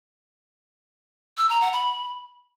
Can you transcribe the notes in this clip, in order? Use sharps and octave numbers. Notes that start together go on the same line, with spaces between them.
E6
A#5
F#5
B5